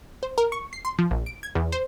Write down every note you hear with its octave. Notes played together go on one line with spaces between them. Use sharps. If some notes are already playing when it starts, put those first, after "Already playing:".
C5
A#4
C#6
C7
C6
F3
A#1
D7
G#6
E2
C5